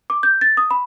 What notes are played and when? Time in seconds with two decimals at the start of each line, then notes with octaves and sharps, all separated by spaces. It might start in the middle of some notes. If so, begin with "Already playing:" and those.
0.10 D6
0.23 G6
0.41 A6
0.57 D#6
0.71 B5